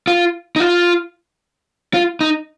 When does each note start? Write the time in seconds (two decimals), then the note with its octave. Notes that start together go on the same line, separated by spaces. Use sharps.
0.07 F4
0.56 D#4
0.60 F4
1.94 F4
2.21 D#4